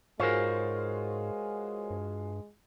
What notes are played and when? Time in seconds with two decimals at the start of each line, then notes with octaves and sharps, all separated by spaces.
0.20 G#2 G#3 F4 F#4 G#4 A#4 C5 C#5
1.90 G2